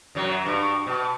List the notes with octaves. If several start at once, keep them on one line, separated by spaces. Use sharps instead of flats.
F#2 F#3
G2
B2